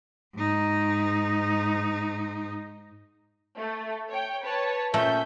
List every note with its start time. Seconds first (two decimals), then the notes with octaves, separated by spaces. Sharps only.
0.35 G#2 D#4
3.56 A3
4.09 C#5 G5
4.42 B4 C#5 A5
4.94 A#2 A3 C#4 E5 G6